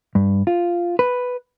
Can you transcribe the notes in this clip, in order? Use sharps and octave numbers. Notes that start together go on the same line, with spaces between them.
G2
F4
B4